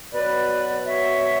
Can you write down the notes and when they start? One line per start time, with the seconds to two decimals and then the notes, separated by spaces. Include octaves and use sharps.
0.14 B2 F#3 B4 D5
0.86 C#5 E5